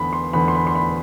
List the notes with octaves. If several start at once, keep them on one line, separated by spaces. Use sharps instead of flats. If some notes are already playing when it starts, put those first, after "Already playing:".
Already playing: E2 D3 B5
C6
E2 D3 B5
C6
B5
C6
B5